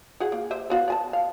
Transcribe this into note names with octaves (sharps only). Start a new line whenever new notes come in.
F#4 G#4 F#5
A#3
G4 C5 E5
B3 F#4 F5
D5 G#5 A5
F5